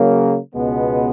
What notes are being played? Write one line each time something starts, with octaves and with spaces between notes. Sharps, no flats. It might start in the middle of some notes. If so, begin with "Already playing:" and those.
Already playing: C#3 F#3 A#3
C#2 B2 G#3 B3